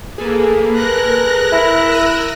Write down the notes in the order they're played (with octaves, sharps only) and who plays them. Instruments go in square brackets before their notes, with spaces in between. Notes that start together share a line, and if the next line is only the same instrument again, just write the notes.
[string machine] A#3 [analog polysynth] G#4 A4 B4
[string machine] A#4 F#6 A#6
[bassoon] E4
[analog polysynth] E6 D#7